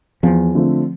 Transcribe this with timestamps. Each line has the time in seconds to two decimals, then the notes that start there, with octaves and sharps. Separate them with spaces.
0.23 E2 F3
0.55 D3 A3 C4 F4